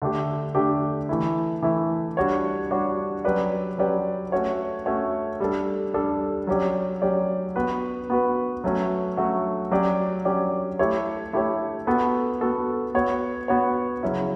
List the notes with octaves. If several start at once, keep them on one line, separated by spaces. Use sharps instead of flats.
D3 A3 D4 G4
D3 A3 D4 G4
E3 A3 E4
E3 A3 E4
G3 D4 F#4 C#5
G3 D4 F#4 C#5
F#3 C#4 G4 B4 D5
F#3 C#4 G4 B4 D5
A3 C#4 F#4 C#5
A3 C#4 F#4 C#5
G3 D4 A4
G3 D4 A4
F#3 C#4 G4 D5
F#3 C#4 G4 D5
B3 F#4 B4
B3 F#4 B4
F#3 A3 C#4 F#4
F#3 A3 C#4 F#4
F#3 C#4 G4 D5
F#3 C#4 G4 D5
A3 E4 G4 C#5
A3 E4 G4 C#5
B3 F#4 A4
B3 F#4 A4
B3 F#4 C#5
B3 F#4 C#5
C#3 F#3 C#4 E4